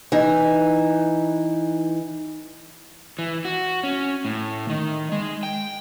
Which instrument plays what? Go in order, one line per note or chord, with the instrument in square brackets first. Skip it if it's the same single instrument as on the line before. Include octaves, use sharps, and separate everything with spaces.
[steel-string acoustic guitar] E3 D#4
[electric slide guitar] E3
F#4
C#4
A2
D#3
G#3
G5